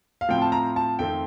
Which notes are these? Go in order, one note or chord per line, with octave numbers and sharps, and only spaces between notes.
F5
A2 F3 C4 G5
A5
A#5
A5
F2 D#3 A3 C4 G5